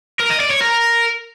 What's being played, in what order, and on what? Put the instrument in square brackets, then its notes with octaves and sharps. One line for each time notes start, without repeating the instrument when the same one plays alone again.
[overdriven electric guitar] A#4
D#5
D5
C#5
A#4